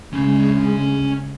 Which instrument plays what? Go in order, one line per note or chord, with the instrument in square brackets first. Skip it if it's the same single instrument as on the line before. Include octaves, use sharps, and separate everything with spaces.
[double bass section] D2 C#3 G#3 [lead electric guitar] C#4 B5